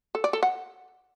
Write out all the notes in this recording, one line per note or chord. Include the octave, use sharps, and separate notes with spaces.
A4
D5
A4
F#5